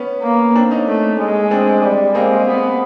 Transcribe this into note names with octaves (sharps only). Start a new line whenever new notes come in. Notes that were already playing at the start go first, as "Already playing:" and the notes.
Already playing: B3 C#4
A#3
C4 D4
C#4 D#4
A3
G#3
C4 D4
G3
G#3 A#3 C4
B3